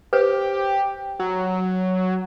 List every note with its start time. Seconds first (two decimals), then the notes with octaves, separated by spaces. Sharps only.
0.13 G4 B4 C5
1.19 F#3